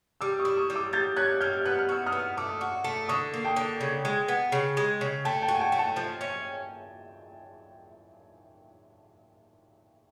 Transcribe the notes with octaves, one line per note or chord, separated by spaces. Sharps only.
G3 D6 E6
C#6 D#6
E4
C#6 D#6
G3
D6 E6
G3 G6 A6
C#4 F#6 G#6
G3 F6 G6
B3 F#6
F6
F#4 E6
D#6 F6
B3
A3 D6 E6
F#4
A3
D3 C#6 D#6
A#3
G5 A5
D3
C#3
G#3
B3
C#3
G#3
C#3
A3 G5 A5
G5 A5
F#4
G#5
G5 A5
A3
G5 A5
F3
C#4